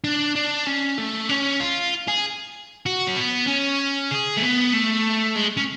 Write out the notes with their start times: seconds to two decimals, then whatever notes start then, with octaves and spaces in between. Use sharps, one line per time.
0.04 D4
0.36 D4
0.66 C#4
0.98 A3
1.29 C#4
1.60 F4
2.08 G#4
2.86 F#4
3.08 C#4
3.17 B3
3.48 C#4
4.11 G#4
4.37 A3
4.42 B3
4.73 A3
5.36 G#3
5.57 C#4